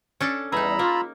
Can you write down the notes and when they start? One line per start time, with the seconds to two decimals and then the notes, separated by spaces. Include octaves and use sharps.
0.20 C#4 D4 A4
0.52 E2 G3 D#4 G#4 A#5 B5 E6
0.79 A#3 F4